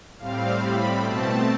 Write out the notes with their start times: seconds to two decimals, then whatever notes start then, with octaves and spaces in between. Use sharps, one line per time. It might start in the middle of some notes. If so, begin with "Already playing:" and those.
0.18 A2 G3 C4 F5
0.60 A2 G3 C4 B5
1.02 B2 A3 C4 A5